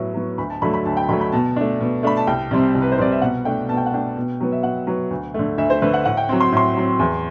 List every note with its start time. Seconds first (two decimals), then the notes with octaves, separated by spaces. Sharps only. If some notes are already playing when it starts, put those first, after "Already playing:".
Already playing: A2 F#3 B3
0.14 F#3 B3
0.38 D2 B5
0.50 A5
0.62 D3 F#3 A3 B5
0.74 B5
0.85 D2 A5
0.97 G5
1.09 D3 F#3 A3 B5
1.21 B5
1.32 B2 A5
1.56 A3 D4
1.81 B2
2.03 A3 D4 B5
2.17 A5
2.27 C2 G5
2.51 C3 G3 C4
2.75 C2
2.82 B4
2.92 C5
2.98 C3 G3 C4 D5
3.12 E5
3.22 B2 F#5
3.45 A3 D4 G5
3.69 B2 A5
3.77 G5
3.86 F#5
3.93 A3 D4 G5
4.17 B2
4.40 F#3 B3
4.52 E5
4.63 B2 F#5
4.87 F#3 B3
5.10 D2
5.34 D3 A3
5.58 D2 E5
5.70 C5
5.81 D3 A3 B4
5.94 F#5
6.05 A2 F#5
6.17 G5
6.29 F#3 C4
6.40 C6
6.52 A2 C6
6.77 F#3 C4
6.99 E2